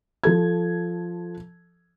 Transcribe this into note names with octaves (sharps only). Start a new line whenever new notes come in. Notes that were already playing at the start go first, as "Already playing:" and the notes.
F3 A4 G#6